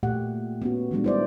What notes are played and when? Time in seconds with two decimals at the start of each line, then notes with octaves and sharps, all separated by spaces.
0.03 A#2 A3 A#3 G4 F#5
0.62 B3 C#4 F#4
0.91 D#3 F3 G3 G#3 B3 D4
1.04 E4 C5 D5